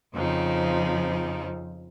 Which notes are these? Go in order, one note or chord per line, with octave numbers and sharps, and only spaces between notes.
F2 C#3 F3 C4 D#4